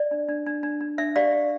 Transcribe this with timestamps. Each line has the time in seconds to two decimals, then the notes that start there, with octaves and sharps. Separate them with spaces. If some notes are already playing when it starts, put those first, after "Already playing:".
Already playing: D5
0.11 D4
0.29 D4
0.46 D4
0.63 D4
0.81 D4
0.98 D4 E5
1.16 G4 D5 F5
1.33 G4